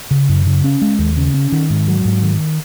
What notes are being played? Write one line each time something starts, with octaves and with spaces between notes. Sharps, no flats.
C#3
F#2
C#3
C#4
G#3
D#2
C#3
C#4
D#3
G#2
F#3
G#2
D#3